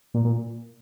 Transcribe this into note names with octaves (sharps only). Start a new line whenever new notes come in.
A#2
A#2